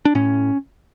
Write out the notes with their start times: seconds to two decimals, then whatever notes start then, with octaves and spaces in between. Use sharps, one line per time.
0.05 D4
0.15 A2 C#4